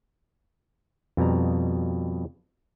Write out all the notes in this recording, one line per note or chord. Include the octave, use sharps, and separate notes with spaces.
F2 B2 G3 A#5